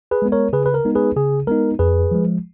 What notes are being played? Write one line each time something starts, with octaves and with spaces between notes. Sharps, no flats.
G#4 B4
G#3 B3
A#4 C#5
C#3 G#4 B4
B4
A#4
G#3 B3 D#4
G#4 B4
C#3 G#4
G#3 B3 D#4 A#4
F2 G#4 B4
F3 G#3